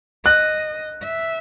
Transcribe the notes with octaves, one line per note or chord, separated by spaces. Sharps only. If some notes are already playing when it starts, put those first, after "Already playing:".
D#5 F#6
E5